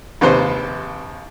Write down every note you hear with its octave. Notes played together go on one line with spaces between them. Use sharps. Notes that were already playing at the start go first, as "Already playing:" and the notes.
A#1 D#2 C3 B4 C5 C6